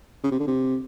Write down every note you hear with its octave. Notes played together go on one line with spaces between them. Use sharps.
C#3
C3
D3
C3